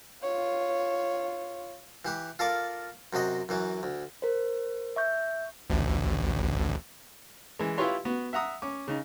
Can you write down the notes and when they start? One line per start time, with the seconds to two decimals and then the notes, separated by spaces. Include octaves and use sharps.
0.23 F4 C#5
2.05 E3 G4 B4
2.39 F4 A4 A#4 D5 D6
3.13 F#2 C3 F#4 D#5
3.49 F#2 E3 F#3
3.83 D2
4.22 A#4 C5
4.96 E5 C#6 G6
5.70 A1 D2
7.59 E3 G#3
7.78 E4 F4 G4 B4 C#5 C6
8.05 B3 F#4
8.33 E5 F#5 A#5 D#6
8.62 C#4 D6
8.88 C#3 D#4